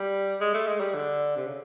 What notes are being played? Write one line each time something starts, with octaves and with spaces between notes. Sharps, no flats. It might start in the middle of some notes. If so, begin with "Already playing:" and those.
Already playing: G3
G#3
A3
G#3
G3
D3
C3
C#3